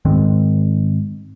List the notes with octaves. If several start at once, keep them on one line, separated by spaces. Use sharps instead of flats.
G#2 D#3 G#3 C4